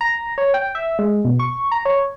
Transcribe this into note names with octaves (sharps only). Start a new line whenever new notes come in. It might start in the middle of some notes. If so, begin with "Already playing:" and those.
A#5
C#5
G5
E5
G#3
B2
C#6
A#5
C#5